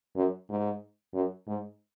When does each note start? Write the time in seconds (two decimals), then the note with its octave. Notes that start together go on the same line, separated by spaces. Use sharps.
0.16 F#2
0.50 G#2
1.14 F#2
1.47 G#2